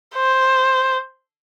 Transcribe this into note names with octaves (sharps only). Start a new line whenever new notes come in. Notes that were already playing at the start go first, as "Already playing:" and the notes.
C5